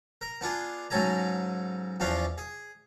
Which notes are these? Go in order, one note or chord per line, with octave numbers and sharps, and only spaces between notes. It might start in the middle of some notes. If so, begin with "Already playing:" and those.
A#4
B3 D4 F4 G#4
G#2 C#3 F#3 A4 G#5 A#5
E2 F3 C#4 D4 F4 F5
G#4